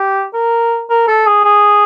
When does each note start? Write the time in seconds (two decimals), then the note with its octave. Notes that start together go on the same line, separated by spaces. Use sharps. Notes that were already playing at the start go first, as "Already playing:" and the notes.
Already playing: G4
0.34 A#4
0.90 A#4
1.08 A4
1.27 G#4
1.44 G#4